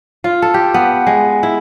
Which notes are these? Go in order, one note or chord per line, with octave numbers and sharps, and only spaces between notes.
F4
A4
G4
B3
G#3
E4